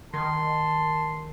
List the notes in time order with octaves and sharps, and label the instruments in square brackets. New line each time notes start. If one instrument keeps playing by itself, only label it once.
[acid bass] D#3 [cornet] A5 [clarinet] C6